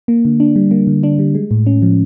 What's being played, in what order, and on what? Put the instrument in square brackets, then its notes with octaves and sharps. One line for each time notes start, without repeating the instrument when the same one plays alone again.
[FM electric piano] A#3
D3
D4
G3
A#3
D3
D4
G3
G#3
A2
C#4
F3